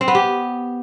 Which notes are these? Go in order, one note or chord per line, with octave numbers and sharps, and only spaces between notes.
C4
B3
G4